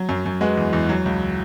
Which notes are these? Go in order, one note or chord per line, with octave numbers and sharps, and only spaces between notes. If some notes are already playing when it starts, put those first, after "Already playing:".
Already playing: F#3
F#2
F#2
G#3 F#4 B4
E2
E2
F#3
C#2